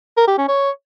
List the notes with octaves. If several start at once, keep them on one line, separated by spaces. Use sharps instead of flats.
A#4
G4
C#4
C#5